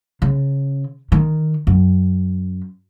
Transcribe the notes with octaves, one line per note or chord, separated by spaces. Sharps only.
C#3
D#3
F#2